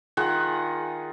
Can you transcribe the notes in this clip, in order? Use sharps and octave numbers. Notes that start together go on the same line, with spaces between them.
D#3 F4 G#4 F#5